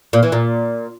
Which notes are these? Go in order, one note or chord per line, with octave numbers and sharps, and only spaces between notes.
A#2
E3
A#2